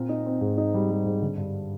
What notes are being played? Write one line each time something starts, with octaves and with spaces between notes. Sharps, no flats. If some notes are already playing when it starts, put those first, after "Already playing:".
Already playing: A#2 C4
D#4
C4
G#2
D#4
G3
G3
G#2
D3
G2